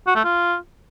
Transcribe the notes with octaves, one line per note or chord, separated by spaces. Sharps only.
F#4
A3
F4